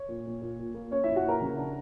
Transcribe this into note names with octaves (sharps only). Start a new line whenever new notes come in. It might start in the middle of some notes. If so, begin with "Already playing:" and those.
Already playing: C#5
A#2
A#2
A#2
A#2
A#3
C#4 C#5
A#2 E4 E5
F#4 F#5
A#2 A#4 A#5
C#3
D4